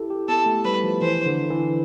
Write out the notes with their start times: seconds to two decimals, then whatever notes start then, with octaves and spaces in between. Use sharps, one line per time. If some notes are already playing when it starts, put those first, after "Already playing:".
Already playing: E4 G4 A4
0.10 G4
0.28 B3 A4
0.46 A3
0.64 G3 B4
0.83 F3
1.01 E3 C5
1.26 D3
1.50 E3